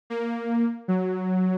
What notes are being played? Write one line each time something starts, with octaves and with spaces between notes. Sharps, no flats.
A#3
F#3